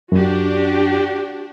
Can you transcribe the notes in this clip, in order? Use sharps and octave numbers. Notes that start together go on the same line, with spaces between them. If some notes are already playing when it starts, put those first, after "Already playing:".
F#2 D4 F#4 G4